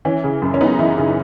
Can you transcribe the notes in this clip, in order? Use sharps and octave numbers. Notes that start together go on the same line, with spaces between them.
E3 C#4
C#3
F#2
C#4
B3 D#4
E3 E4
C#3 E4